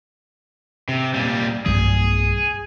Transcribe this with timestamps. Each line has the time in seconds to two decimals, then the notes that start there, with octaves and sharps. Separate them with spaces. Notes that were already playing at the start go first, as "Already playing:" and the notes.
0.89 C3
1.14 A#2 G3
1.66 B1 G2 F#3 G#4